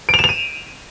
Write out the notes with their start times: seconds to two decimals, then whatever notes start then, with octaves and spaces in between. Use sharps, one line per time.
0.09 D7
0.14 F7
0.19 E7
0.24 F7
0.29 D#7